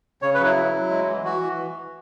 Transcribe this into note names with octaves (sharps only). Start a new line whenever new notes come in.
C#3 C#5
B4
F#3 E4
F#3
F#3
G#3
E3
E3 F#4
E3